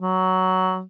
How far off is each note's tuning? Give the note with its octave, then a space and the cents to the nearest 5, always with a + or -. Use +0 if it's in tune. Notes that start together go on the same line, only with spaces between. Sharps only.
F#3 +10